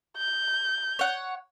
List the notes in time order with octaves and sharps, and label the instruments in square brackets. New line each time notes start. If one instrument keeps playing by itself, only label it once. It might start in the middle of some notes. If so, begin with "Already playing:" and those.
[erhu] G6
[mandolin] C#5 F#5